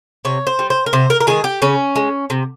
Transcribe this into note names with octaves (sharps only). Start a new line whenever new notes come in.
C3 C#5
C5
G3
C5
A#4
C3 C5
A#4
A#4
D#3 G#3 G#4
G4
C#3 C#4
G#3
C3